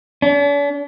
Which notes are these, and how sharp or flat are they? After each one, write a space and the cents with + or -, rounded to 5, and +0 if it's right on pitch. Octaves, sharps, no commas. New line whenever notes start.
D4 -45